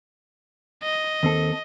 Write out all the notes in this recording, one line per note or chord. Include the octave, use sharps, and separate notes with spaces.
D#5
D#2 C4 A4